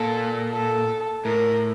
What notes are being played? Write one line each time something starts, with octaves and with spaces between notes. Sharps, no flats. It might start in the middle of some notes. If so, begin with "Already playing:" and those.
Already playing: A#2 A4
A4
A2 A#4